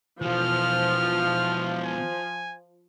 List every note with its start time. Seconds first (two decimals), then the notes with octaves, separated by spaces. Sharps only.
0.22 B2 E3 F3 F6
1.85 G#5